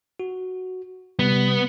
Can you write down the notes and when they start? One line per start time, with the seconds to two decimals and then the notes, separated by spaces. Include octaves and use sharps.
0.20 F#4
1.19 C3 G3 B3